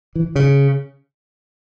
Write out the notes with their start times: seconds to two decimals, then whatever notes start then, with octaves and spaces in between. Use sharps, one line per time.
0.15 E3
0.36 C#3